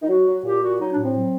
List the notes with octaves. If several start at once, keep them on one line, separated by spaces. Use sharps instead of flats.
D#4
F#3 F#4
F#3
A#2 G4
A#2 F#4
F#3 D#4
D4
A2
C4
F#3